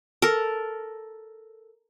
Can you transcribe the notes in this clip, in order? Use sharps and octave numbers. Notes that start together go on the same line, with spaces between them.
A4 A#4